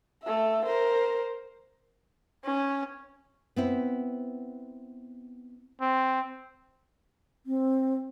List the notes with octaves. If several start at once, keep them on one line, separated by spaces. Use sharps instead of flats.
A3 E5
A#4 C5
C#4
B3 C4 E4
C4
C4